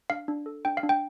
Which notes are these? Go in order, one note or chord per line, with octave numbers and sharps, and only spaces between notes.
D4 F5
D4
A4
D4 G5
F5
D4
G5